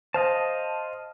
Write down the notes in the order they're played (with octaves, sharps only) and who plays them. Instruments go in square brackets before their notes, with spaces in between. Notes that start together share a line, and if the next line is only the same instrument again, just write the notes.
[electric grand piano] C5 [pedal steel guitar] D#5 F5 A5